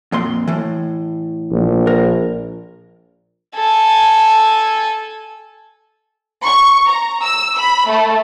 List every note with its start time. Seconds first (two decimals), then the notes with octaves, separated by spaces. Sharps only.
0.12 F2 A#2 C6
0.47 A2 E3
1.51 A#1
1.87 A#4
3.55 A4 G#5
6.44 C#6
6.87 A#5
7.22 E6
7.58 B5
7.88 A3